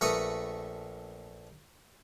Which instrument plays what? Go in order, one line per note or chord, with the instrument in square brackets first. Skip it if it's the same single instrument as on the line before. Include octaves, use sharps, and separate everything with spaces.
[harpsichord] A#1 A3 B4 A#5 C#6 D#6